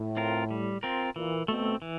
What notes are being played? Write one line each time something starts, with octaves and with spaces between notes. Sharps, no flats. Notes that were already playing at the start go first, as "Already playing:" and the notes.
Already playing: A2
C4 F4 A#4
G3
C4 F4 A#4
A#2 E3
B2 A3
C4
E3